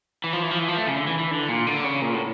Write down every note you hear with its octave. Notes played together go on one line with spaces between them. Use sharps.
E3
F3
E3
F3
E3
F3
A3
C#3
D3
E3
E3
D3
A#2
D3
C#3
A#2
A2